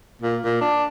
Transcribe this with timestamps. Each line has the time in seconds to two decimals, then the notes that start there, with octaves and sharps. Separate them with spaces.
0.22 A#2
0.44 A#2
0.61 D4